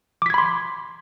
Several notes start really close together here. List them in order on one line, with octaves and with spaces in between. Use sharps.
D6 B6 G#6 B5 C6